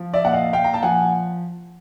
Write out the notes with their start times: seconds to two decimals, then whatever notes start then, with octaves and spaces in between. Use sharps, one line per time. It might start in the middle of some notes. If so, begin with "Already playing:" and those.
Already playing: F3
0.13 D5 E5
0.24 A#2 F#5
0.33 D#5 F5
0.53 A#2 F5 G5
0.64 A#5
0.74 A5
0.83 F3 F#5 G#5